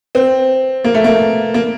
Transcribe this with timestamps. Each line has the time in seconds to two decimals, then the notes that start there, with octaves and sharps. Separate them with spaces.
0.15 C4
0.84 A#3
0.94 A3
1.04 A#3
1.54 A#3